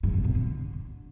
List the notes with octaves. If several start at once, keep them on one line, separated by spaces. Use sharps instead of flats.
G2
C3
B2
D3